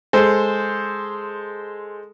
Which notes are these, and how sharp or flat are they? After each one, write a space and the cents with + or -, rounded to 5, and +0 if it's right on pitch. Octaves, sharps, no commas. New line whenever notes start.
G#3 +0 A4 +0 C5 +0